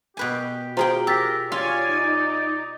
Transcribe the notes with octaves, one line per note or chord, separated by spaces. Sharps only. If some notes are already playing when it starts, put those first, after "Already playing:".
B2 G4 B4 G#5
F4 F#4 G#4 C5 G5 A#5
G4 A#4 E6 A6 B6
F4 C#5 D5 F5 G#5
D#4